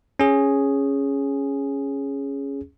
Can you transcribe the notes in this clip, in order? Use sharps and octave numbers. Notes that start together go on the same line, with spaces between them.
C#4 G#4